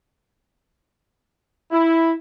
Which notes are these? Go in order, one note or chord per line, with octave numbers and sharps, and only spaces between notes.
E4